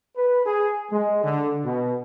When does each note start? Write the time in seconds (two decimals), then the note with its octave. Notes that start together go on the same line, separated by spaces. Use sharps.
0.17 B4
0.46 G#4
0.92 G#3
1.24 D3
1.65 B2